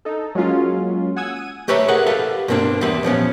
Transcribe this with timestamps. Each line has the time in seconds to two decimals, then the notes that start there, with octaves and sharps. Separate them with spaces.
0.05 D#4 A4
0.35 F#3 G#3 A#3 C#4 F4
1.16 F#5 G#5 D#6 E6 G#6
1.36 D#7
1.68 A3 G4 B4 C#5 E5 A#5
1.88 G#4 A#4 B4 F#5
2.06 G4 A4 B4 F5
2.48 G2 B2 A#3 C4 D4
2.81 E2 G4 B4 E5 B5 C6
3.03 A#2 F3 B3 C#4